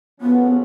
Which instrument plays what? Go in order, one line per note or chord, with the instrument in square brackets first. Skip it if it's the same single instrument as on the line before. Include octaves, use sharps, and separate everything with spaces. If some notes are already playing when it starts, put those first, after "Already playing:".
[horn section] C#3 F3 A3 C#4 F#4 [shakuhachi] B3